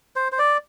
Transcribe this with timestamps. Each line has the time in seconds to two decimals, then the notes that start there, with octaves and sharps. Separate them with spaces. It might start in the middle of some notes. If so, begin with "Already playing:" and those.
0.16 C5
0.32 C5
0.39 D5